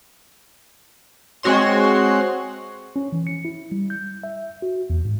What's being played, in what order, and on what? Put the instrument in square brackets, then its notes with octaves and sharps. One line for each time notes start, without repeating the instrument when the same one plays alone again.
[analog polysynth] G#3 C4 F#4 C#5 C6
[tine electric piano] C#4
E3
C#7
E4
G3
G6
E5
F#4
E2
G#2